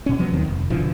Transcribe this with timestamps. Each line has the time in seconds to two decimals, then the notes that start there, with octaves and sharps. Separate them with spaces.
0.06 B2 C#4
0.19 F3 F#3 B3
0.32 D#2 D#3 C4
0.48 F1
0.70 B2 D3 E3 F3